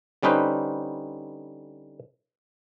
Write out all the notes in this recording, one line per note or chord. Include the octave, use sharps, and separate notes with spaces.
D3 G3 C#4 D#4 B4 C5